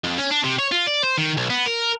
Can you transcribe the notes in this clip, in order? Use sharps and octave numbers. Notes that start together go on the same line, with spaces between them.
F2
C#4
D4
C3
C#5
F4
D5
C5
D#3
B1
B3
A#4